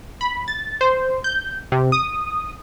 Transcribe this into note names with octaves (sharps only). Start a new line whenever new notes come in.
B5
A6
C5
G6
C3
D#6